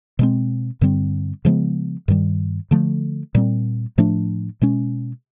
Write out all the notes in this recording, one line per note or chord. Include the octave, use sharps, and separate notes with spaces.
B2 G#3 C4
G2 D3 G3 C4
C#3 F3 G#3 B3
G2 D#3 G3
D3 F3 A3
A#2 G3 C4
A2 F3 A3 D4
B2 G#3 C#4